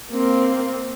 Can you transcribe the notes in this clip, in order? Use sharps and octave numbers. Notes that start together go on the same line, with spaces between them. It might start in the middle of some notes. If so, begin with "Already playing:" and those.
A#3 C4